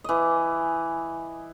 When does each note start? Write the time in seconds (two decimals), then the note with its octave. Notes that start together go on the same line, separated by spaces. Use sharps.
0.04 E3 D#5